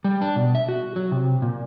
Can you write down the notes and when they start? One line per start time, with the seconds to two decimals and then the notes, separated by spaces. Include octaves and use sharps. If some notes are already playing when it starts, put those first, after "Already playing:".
0.04 G3
0.21 D4
0.36 B2
0.55 E5
0.69 F#4
0.96 F#3
1.11 C3
1.42 A#2